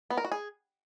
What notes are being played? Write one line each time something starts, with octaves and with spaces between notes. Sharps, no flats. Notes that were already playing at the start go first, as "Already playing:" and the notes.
B3
A#4
F#4
G#4